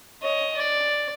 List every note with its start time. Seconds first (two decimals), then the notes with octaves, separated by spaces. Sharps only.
0.22 C#5 D#5
0.57 D5